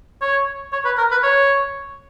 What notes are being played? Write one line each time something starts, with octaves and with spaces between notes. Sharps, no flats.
C#5
C#5
B4
A#4
B4
C#5